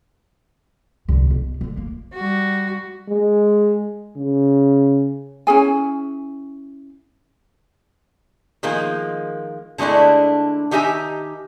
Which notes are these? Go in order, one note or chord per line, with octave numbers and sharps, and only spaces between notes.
C2 D3
B1
D3 F3
A#3
G3 F#4
G#3
C#3
C#4 E4 G#4 G#5
D#3 F3 G#3 A#3
D3 G#3 A3 D4 E4
D#3 D#4 G4 E5 G#5 A#5